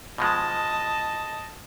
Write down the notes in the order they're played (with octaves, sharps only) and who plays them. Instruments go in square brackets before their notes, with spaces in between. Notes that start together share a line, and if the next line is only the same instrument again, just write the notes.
[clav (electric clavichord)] B2 F3 G#3 [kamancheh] D#5 A5